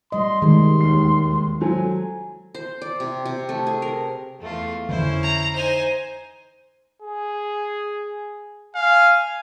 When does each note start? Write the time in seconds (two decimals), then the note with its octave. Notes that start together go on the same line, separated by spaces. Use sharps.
0.12 G3 D#5 C6
0.42 C3 D#3 G#3
0.81 E1 D#2 C7
1.61 F#3 A4 C5 G#5
2.55 C5
2.82 D5
3.00 C3
3.26 C3
3.49 A3
3.67 G#4
3.82 A#4
4.40 E2 A3 F4
4.89 F2 D3 E3 C#4 E4 C5
5.23 A#5
5.53 D#4 C5 G#5
7.02 G#4
8.75 F5 G#5